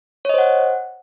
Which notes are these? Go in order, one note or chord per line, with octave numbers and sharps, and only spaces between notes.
C5 C#5 D#5 F#5